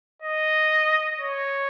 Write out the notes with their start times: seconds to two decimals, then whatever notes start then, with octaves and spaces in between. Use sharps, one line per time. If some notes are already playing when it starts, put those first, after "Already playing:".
0.22 D#5
1.20 C#5